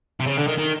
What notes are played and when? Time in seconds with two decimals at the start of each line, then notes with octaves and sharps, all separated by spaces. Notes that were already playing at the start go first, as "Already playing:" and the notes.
0.20 C3
0.27 C#3
0.38 D3
0.48 D#3
0.58 D#3